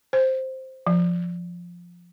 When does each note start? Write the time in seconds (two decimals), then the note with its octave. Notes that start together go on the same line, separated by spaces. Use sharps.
0.13 C5
0.87 F3